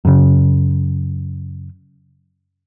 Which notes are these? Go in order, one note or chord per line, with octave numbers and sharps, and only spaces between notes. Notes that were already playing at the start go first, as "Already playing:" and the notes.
F#2 C#3